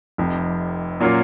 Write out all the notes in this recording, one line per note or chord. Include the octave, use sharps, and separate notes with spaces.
F1 F2 C3
A#2 F#3 A#3 C#4 F4